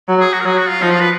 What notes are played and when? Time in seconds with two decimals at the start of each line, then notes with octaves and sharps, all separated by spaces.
0.08 F#3
0.20 G#4
0.33 F#4
0.41 A#4
0.45 F#3 G#4
0.58 F#4
0.69 F4
0.82 F3 D#4
0.91 F4
1.01 B4